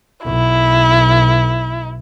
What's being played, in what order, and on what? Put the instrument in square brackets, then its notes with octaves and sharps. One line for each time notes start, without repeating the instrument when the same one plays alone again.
[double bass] B1 [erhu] E4